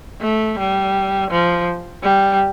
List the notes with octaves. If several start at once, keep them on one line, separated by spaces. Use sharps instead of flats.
A3
G3
F3
G3